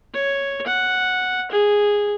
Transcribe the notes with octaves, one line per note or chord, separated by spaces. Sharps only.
C#5
F#5
G#4